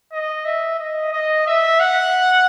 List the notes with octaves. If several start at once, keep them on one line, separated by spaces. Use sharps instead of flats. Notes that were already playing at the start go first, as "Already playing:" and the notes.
D#5
E5
D#5
D#5
E5
F#5